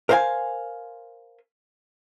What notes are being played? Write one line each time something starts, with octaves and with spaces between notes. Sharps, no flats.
A#4 C5 F5 G5 G#5